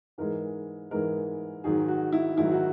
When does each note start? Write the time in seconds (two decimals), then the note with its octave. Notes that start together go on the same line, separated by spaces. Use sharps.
0.18 G#2 E3 G#3 A#4
0.91 G#2 E3 G#3 A#4
1.64 G#2 D#3 F#3 G#4
1.88 F#4
2.12 E4
2.37 G#2 D#3 F#3 E4
2.52 F#4